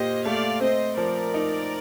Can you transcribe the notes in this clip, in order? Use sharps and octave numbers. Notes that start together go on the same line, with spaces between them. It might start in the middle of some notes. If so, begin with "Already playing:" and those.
Already playing: A#2 G4 C5 D#5
A3 D5 F5
C4 C5 D#5
F3 A#4 D5
D#4